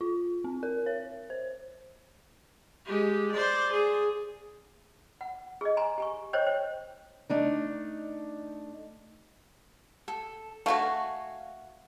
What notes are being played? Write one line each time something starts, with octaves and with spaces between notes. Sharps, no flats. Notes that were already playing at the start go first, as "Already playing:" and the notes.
F4
C4
A#4
C#5
C5
G#3 G4
C5 D5
G#4
F#5
G#4 D#5
G#5 A#5 C6
G4 G#5 C#6
C5 C#5 D#5 G5
C5 G5
A3 D4 D#4
A4
A3 F#4 F5 G#5